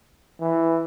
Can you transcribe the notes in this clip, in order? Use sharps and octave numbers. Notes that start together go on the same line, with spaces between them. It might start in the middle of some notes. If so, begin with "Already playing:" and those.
E3